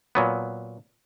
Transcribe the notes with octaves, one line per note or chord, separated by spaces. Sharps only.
A#2 F#3 B3